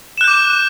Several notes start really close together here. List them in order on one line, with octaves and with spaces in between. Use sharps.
E7 F#6 G6 D6